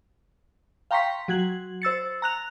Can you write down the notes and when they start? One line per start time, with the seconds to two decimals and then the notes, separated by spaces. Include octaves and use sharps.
0.91 F5 G5 A#5 C6 C#6 B6
1.28 F#3 F#4 G#6 F#7
1.82 C5 E6 A6 C#7
2.22 A#5 F#6 F7